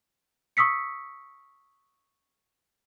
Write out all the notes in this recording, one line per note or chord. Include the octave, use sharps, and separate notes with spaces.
C#6 D#6 E6 B6 C#7